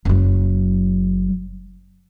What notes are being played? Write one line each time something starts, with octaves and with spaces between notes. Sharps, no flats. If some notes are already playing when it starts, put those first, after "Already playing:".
F#1 F#3